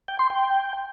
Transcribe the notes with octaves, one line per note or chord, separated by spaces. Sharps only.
G5
C6
G5